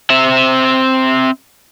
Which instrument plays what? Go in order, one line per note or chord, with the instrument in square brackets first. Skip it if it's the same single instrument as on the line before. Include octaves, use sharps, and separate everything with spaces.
[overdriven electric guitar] C4 E5